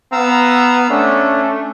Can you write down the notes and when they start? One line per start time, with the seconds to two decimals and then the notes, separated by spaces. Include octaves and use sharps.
0.12 B3 F5 A#5 E6
0.90 A3 C#4 D4